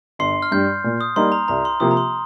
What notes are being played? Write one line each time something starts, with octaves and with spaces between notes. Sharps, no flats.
G1 C6 C7
F6
G2 G3 G6
A#2
D#6
G3 A#3 D#4 C6
A#5
C2 A#5
C6
C3 F3 A#3 G4 D#6
A#5
C6